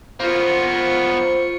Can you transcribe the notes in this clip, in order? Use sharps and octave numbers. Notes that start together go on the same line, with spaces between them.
A#3 B3 F4 C5 C#6